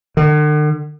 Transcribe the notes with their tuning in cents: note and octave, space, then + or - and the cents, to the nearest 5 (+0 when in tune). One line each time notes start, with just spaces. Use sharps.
D3 +45